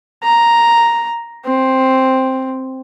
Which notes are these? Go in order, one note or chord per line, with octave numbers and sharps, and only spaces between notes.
A#5
C4